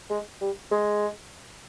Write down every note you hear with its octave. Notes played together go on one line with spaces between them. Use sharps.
G#3
G3
G#3